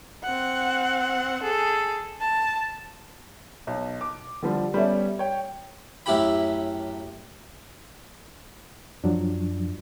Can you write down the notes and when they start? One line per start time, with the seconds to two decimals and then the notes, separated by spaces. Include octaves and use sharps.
0.24 C4 F#5
1.43 G#4 A4
2.21 A5
3.67 B1
4.01 D6
4.42 D3 F3 G3
4.74 G3 B3 C#4 A4 C#5 E5
5.19 C#5 G5
6.06 F#2 A2 E4 G4 G5 B5
9.04 F#2 F3 F#3 D4